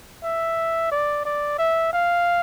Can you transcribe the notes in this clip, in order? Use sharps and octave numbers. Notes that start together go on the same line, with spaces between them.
E5
D5
D5
E5
F5